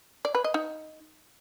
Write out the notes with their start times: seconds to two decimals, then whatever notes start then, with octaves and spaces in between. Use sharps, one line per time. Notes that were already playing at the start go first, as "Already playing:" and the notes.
0.25 D5
0.35 B4
0.44 D#5
0.54 D#4